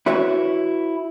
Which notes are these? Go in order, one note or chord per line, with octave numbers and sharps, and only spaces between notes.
E4 F#4 B4 C#5 E5